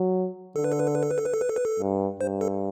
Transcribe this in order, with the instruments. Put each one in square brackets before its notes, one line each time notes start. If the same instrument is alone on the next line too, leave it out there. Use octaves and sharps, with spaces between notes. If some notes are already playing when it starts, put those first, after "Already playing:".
Already playing: [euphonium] F#3
[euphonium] D3 [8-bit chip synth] A4
[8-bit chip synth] B4
A4
B4
A4
B4
A4
B4
A4
B4
A4
B4
A4
B4
A4
[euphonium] G2
[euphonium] G2 [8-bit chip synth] C5
[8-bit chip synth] A4